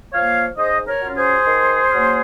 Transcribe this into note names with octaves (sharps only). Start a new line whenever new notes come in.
F3 A#3 C#5 F5
G#2 C5 D#5
A#4 C#5
F#3 C#4 F4
G#4 C5
D#3
F#3 A#3 C#4